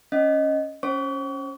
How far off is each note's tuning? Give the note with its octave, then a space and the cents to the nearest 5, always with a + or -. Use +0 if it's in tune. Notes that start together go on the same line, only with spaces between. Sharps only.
C#4 +0 D#5 +0
C#4 +0 C5 +30 C#6 +40